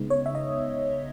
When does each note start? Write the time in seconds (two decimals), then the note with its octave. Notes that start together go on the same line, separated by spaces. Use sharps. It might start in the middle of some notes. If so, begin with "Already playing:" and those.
Already playing: C#3 G#3 B3 D#4
0.10 C#5
0.26 E5
0.35 D#5